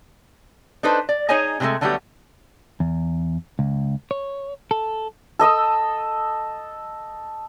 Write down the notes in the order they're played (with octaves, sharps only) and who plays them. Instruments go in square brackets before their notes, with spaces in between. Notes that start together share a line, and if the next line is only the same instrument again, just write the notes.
[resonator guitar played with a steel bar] D4 D#4 A4 B4 C5
D5
D#4 G#4 C#5 D#5 G#5 A#5
C3 E3 F#3 G#3 A3
D3 F#3 G3 A3 B3 G4
[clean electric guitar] E2
C#2
C#5
A4
[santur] A4 D#5 D#6 E6